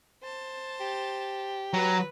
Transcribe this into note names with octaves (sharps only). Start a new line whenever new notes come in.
C5 A5
G4
F#3 B4 A#5